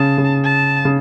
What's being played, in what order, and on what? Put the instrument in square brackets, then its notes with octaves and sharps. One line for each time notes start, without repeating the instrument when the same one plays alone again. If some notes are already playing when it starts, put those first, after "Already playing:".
Already playing: [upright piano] C#3 [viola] A5
[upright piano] C#3
[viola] A5
[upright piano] C#3